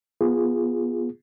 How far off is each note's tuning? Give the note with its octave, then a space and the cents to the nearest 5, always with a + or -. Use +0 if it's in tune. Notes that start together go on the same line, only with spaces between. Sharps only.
B3 -15 F4 +0 G#4 -10